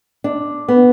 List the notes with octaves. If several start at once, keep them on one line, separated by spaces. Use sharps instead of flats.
D4
B3